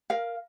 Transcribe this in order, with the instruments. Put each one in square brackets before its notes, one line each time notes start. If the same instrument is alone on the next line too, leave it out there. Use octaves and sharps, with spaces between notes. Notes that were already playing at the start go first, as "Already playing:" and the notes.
[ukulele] A#4 F5